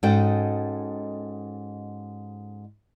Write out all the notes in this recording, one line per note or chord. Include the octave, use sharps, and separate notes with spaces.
G#2 C#4 F#4 A4 D#5 G5